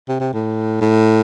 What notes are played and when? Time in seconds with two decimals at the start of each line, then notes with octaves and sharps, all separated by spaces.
0.08 C3
0.20 C3
0.33 A2
0.81 A2